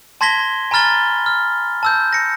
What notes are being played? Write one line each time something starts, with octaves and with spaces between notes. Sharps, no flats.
A5 C6 G#6 A#6 B6 G7
G#5 A#5 B5 F6 A6 G7
F6
A5 E6 G6
A#6 C#7